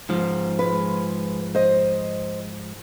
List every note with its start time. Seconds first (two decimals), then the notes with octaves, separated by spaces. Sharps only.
0.09 G#2 F3
0.59 G#3 B4
1.55 C5 D#5